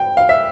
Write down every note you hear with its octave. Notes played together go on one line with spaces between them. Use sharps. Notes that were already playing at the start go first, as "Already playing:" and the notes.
Already playing: G5
F5
E5